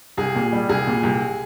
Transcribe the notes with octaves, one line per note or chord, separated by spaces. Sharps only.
C2 G#4
A#2
G3
C2 G#4
A#2
C2